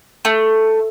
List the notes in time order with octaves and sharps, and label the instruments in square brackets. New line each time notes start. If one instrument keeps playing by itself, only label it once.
[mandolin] A3